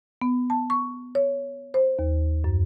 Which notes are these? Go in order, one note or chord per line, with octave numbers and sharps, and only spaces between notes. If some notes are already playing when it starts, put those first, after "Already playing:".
B3
A5
C#6
C#5
C5
D#2
F#2